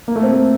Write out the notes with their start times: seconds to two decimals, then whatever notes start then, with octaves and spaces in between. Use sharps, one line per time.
0.08 A#3
0.16 A3
0.23 C4
0.32 A3